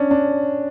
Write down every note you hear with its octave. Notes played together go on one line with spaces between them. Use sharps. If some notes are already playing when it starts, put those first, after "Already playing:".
Already playing: C#4 D4
D4